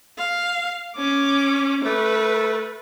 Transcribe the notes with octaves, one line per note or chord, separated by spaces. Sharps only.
F5
C#4 D6
A3 B4